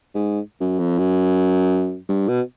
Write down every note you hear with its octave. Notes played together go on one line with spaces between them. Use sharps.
G#2
F#2
F2
F#2
G2
B2